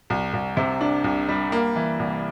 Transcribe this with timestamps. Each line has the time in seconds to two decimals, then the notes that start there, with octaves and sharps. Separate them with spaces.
0.10 C2
0.33 C2
0.57 C3
0.81 D4
1.04 C2
1.29 G3
1.52 A#3
1.76 E3
1.99 C2